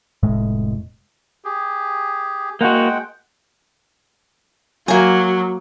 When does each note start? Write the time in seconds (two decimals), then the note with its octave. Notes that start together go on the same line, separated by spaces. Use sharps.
0.23 F1 A2 G#3
1.45 G4 G#4
2.61 G#3 A#3 F#4 F#5 G5
4.88 F#3 A#3 G#5